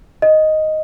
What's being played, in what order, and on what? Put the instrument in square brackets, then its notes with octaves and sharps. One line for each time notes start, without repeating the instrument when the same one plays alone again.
[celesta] D#5